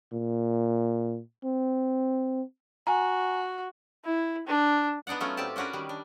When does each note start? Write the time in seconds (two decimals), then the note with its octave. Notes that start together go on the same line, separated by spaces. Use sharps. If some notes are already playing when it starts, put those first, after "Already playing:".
0.13 A#2
1.44 C4
2.87 F#4 G#5 A#5
4.05 E4
4.47 D4
5.07 B3 D4 D#4 D5 F#5
5.20 F#3 A3 B3 C#4 F4
5.37 A2 C4 G4 D5 A5
5.56 C#4 D4 F#4 A#4 B4
5.73 D#3 G3
5.89 D4